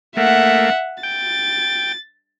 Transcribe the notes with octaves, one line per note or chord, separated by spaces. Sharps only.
A3 A#3 E5 F#5
G5 A6